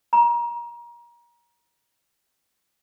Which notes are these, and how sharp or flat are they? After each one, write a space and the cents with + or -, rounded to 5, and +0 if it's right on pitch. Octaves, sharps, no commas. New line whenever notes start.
A#5 +30